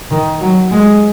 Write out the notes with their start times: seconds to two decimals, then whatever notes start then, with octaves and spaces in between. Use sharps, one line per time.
0.11 D#3
0.40 F#3
0.71 G#3